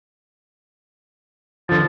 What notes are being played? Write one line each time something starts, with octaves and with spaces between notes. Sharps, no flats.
D3 F3 A5